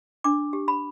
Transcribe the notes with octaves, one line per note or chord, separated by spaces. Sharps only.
D4 D6
G4
B5